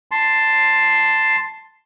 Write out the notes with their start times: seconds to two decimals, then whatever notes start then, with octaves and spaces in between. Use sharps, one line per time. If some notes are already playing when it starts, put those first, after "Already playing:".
0.11 A5 C6